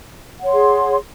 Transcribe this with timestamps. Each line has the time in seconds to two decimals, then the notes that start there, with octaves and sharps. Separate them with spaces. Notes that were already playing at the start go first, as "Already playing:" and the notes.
0.39 F#5
0.44 C#5
0.48 C6
0.53 G#4